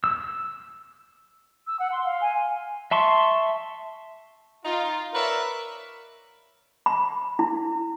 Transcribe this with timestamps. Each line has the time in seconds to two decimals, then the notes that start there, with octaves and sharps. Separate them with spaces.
0.04 E6
1.67 E6
1.79 F#5
1.92 C6
2.04 F5
2.21 G#5
2.91 E5 A5 C6 C#6
4.64 D#4 F4
5.13 A#4 B4 C#5 D5 E5
6.86 B5
7.39 E4